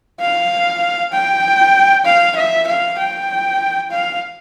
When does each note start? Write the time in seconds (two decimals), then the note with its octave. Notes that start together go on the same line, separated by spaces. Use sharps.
0.20 F5
1.12 G5
2.05 F5
2.36 E5
2.67 F5
2.98 G5
3.90 F5